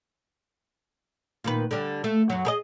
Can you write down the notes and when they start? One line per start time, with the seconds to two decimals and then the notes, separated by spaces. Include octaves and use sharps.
1.44 A#2 D#3 B4
1.71 D3 G3
2.04 A3
2.30 F#2 F#3
2.45 G#4 A#4 D#5